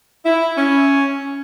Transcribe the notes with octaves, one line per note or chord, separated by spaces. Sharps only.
E4
C#4